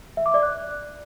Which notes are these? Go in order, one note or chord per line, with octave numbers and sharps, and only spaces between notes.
E5
D6
D5
F#6